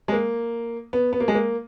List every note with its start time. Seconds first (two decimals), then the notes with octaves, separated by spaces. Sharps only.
0.08 G#3
0.12 A#3
0.93 B3
1.13 B3
1.20 A#3
1.28 G#3
1.35 A#3